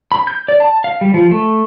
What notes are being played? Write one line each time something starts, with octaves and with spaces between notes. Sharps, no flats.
B5
G6
D5
A5
F5
G3
F3
A3